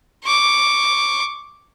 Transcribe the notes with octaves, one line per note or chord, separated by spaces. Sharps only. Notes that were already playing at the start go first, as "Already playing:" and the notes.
C#6 D6